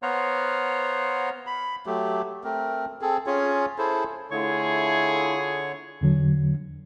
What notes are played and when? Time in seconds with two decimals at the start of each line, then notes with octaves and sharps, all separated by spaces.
0.03 B3 C5 C#5 F5 F#5 A#5
1.47 B5
1.86 F#3 A3 G4
2.44 A3 C4 A#4
3.02 C4 G#4 A4
3.27 C#4 F4 G#4 C#5
3.78 E4 G#4 A4 C5
4.31 D3 A3 E4 F4 G#4 C#5 C#6
6.01 E2 D3 F#3